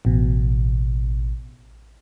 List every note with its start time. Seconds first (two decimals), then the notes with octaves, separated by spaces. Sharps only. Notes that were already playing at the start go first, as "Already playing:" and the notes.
0.05 A1 B2